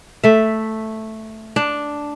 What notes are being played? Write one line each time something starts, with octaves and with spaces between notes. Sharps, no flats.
A3 E5
D4